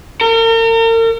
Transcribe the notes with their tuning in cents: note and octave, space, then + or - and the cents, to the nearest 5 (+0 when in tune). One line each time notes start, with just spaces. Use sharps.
A#4 -40